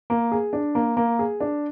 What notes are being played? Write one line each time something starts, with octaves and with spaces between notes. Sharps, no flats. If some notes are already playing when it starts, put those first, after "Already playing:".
A#3
G#4
D4
A#3
A#3
G#4
D4